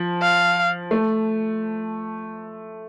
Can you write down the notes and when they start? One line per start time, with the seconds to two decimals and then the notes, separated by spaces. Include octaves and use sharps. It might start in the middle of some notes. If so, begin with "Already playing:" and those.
Already playing: F3
0.22 F5
0.91 A3